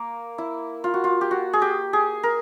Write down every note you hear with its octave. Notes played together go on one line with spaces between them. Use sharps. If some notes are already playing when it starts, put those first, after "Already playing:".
Already playing: A#3
E4
F4
F#4
F4
G4
F#4
G#4
G4
G#4
A#4